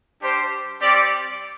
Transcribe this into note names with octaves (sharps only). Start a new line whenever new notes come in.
G3 D4 G4 C5
G3 C4 G4 D5